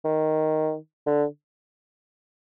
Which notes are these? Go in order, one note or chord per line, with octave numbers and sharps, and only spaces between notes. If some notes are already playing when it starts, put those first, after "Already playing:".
D#3
D3